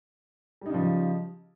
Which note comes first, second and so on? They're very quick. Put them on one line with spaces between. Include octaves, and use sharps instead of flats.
G3 D#4 C#3 F3